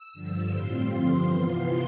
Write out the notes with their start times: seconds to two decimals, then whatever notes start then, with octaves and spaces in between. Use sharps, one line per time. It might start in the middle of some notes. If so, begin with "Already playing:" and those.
Already playing: E6
0.13 G2 D3 F3
0.50 A2 G3 C4 F4 C6
0.89 G2 D3 F3 C4 F4 C6
1.26 C3 E3 B3 F4